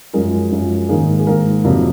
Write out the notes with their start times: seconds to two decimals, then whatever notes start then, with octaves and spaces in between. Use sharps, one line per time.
0.13 F#2 F3 G#3 A#4
0.51 F#2 F3 G#3
0.89 G#2 D#3 A#3 G#4
1.19 G#4
1.27 G#2 D#3 A#3 A#4
1.64 F2 C3 F#3 A#3